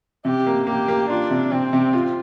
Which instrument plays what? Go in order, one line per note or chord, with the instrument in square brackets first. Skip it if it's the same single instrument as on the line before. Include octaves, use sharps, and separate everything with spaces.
[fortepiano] C3 [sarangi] G4
[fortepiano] A#3
[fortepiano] A#3 [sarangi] G4
[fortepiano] A#3
[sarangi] D4 [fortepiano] F4
[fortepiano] C3
[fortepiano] C3 [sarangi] C4
[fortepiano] C3
F4